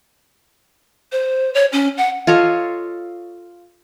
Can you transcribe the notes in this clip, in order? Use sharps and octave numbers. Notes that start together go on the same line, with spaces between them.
C5
C#5
C#4
F#5
F4 A4 C#5 D#5